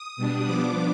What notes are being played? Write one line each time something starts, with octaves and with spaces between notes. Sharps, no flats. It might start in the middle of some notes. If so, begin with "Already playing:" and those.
Already playing: D#6
B2 G3 D4
F3 B3 D4 D6